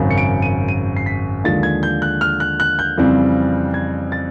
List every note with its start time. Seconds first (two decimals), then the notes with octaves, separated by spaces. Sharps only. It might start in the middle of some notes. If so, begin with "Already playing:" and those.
Already playing: G#1 F#2 C#3
0.11 C#7
0.18 D7
0.42 D#7
0.68 D#7
0.97 C7
1.06 B6
1.44 D#2 D3 F3 G#3 A6
1.63 G#6
1.83 G6
2.02 F#6
2.21 F6
2.40 F#6
2.60 F#6
2.79 G6
2.97 F2 C#3 E3 G3 C4
3.74 G#6
4.12 A6